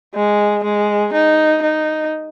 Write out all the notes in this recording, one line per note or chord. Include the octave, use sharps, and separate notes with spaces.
G#3
G#3
D#4
D#4